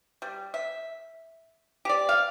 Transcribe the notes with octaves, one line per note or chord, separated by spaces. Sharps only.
G3
E5
G4 D5
F5